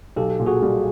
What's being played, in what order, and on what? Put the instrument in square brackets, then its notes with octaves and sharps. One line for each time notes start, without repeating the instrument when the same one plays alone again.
[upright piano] B1 [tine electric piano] G4 A4
[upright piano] A#2
[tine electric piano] F#4 G#4
[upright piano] G3